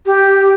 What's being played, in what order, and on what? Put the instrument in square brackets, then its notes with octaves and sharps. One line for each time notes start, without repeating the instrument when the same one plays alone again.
[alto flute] G4